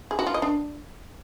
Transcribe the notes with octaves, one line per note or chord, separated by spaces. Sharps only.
G#4
F#4
F4
D#5
D4